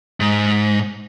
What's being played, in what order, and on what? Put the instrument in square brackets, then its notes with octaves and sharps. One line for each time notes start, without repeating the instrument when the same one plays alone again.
[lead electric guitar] G#2